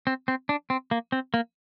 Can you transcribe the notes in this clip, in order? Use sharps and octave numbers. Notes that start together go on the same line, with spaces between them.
C4
C4
D4
C4
A#3
C4
A#3